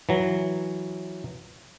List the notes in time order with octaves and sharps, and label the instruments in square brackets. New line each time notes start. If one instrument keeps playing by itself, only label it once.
[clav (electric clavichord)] E3 F#3